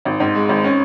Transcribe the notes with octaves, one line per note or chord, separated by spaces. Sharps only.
G#1
G#2
G#3
G#1
C#4